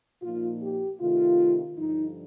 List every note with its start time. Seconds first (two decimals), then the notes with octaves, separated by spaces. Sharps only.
0.22 A#2 F3 A#3 D#4 F4
0.62 G4
1.00 C3 D#3 A3 F4
1.77 G2 D3 F3 D#4